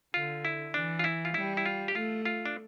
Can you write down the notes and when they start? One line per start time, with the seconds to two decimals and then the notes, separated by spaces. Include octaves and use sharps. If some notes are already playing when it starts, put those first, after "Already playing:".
0.14 D3 F4
0.45 E4
0.74 E3 D4
0.99 F4
1.04 E4
1.25 F4
1.34 G3 E4
1.57 E4
1.66 F4
1.88 G4
1.95 A3 F4
2.25 F4
2.46 D4